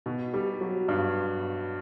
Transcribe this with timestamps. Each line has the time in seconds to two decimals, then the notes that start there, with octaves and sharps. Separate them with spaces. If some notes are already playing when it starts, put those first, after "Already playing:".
0.06 B2
0.34 G3
0.61 F#3
0.88 G2